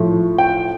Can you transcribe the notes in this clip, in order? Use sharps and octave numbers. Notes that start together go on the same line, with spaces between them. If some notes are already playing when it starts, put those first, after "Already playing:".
Already playing: A2 F3
G5